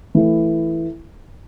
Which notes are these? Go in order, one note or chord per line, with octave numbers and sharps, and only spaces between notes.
E3 A3 E4